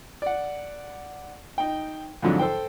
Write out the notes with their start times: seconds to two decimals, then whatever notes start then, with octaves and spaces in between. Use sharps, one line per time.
0.22 D5 F#5
1.58 D#4 G5
2.22 F2 G#2 D3 F#3
2.39 A4 C5 G5